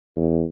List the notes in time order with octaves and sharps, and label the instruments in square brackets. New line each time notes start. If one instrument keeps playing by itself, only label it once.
[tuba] E2